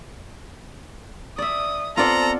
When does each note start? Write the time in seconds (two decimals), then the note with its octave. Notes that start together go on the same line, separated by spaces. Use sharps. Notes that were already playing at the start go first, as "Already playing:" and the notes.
1.38 D5 E5 D#6
1.97 B3 C4 F4 A4 C5 D5 F#5 A#5